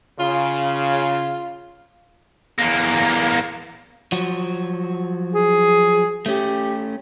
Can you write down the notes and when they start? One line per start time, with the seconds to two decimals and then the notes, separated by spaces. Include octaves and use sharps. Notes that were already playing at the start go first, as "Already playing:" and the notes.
0.20 C#3 F4
2.59 E2 A#3
4.12 F3 F#3 F#4
5.35 G#4
6.26 A3 C#4 G4